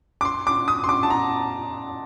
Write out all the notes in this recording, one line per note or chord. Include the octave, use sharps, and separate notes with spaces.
D6
C6
D6
D#6
C6
D6
A5
A#5